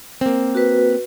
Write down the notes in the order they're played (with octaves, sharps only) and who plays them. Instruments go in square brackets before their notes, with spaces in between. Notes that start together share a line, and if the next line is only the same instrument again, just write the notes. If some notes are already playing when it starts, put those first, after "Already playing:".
[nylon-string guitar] A#3 C4
[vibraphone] F#4 B4